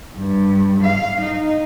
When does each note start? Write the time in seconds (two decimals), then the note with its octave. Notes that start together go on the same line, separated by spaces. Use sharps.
0.16 G2
0.83 F5
1.21 D#4